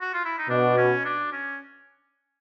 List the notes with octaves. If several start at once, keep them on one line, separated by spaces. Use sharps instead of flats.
F#4
F4
E4
D#4
B2 D4
C#4
D4
C#4